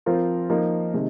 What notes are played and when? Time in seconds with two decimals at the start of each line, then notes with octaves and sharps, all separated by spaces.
0.06 F3 C4 F4 A#4
0.50 F3 A#3 D#4 A#4
0.94 C3 D#3 G#3 D#4